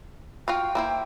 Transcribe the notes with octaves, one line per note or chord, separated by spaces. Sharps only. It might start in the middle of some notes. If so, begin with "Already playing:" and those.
F4 F#4 F5 G5
A#3 E4 C5